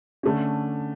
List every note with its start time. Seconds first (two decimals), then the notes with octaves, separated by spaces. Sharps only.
0.23 D3 A3 C#4